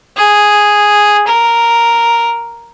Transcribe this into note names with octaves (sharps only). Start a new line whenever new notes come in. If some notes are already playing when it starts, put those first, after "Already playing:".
G#4
A#4